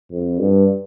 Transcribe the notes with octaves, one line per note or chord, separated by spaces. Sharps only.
F2
G2